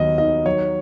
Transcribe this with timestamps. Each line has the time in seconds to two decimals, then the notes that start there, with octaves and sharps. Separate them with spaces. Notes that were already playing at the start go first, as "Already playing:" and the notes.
Already playing: D#2 F#3 B3 D#5
0.18 D#3 D#5
0.46 F#3 C#5